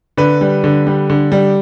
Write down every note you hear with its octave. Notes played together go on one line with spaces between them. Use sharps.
D3 B4
G3
D3
G3
D3
G3